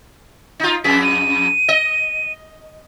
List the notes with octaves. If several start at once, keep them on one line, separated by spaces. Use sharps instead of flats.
D#4 F4
F2 G#4 B6
D#7
D#5